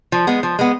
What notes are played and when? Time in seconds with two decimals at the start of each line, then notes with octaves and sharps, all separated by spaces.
0.12 F3
0.27 G#3 B3
0.43 F3
0.59 G#3 B3